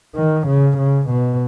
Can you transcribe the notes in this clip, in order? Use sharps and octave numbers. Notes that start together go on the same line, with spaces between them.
D#3
C#3
C#3
B2